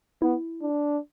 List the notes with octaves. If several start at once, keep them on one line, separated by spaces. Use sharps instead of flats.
B3 E4
D4